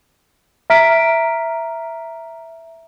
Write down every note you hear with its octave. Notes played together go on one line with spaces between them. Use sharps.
E5 A#5 F6 B6 D7